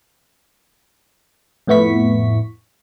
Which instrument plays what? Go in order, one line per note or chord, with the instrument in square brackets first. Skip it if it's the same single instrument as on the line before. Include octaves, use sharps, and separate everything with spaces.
[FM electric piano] F2 A2 B3 E4 C#6 B6